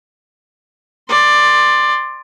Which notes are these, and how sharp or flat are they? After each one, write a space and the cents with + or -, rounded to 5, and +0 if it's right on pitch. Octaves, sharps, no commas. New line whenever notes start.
D5 +10 C6 +5